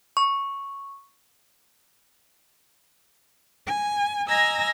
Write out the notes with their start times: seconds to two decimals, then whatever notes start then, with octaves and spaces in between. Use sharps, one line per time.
0.17 C#6
3.66 G#5
4.27 D#5 G#5 A#5 E6 G#6 A#6